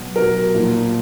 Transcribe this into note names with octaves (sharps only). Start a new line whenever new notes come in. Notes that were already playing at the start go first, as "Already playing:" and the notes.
Already playing: B2 F#3
B2 F#3 A#4
A#2 F3